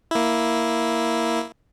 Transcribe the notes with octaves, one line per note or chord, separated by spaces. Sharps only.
A#3 E4